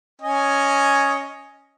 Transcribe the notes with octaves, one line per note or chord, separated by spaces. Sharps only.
C#4 D#5 G#5